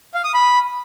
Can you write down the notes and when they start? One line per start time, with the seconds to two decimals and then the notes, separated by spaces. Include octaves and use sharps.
0.14 F5
0.24 D#6
0.34 B5